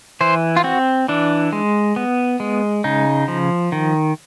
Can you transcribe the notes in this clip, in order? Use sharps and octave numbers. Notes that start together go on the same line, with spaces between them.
E3 C5
F4
C4 F#4
E3 D4
G#3
B3
G#3
C#3 D#4
F3
D#3